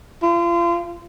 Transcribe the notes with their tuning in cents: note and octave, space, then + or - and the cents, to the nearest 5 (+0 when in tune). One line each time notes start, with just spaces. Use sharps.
F4 -35